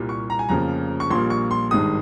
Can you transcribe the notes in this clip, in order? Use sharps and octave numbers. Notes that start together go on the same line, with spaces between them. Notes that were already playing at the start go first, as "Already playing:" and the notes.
Already playing: C2 A#2 G3 A#3
C#6
A#5
G#5
F1 F2 C#3 F3 A#3 A#5
C#6
A#1 A#2 G3 A#3 C6
C#6
C6
G#1 G2 D#3 G#3 D#6